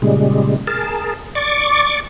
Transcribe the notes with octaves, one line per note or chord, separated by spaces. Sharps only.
A#2 C#3 G3 G#3
G#4 A#4 A5
D5 C#6 D6